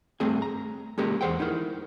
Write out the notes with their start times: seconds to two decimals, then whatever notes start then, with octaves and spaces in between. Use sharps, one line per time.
0.20 G2 A3 C4 G#4 G#5
0.42 A#5
0.98 G#3 A#3 C#4 G4 A#4
1.21 E2 C5 F#5 G5
1.40 D#4 E4 A#4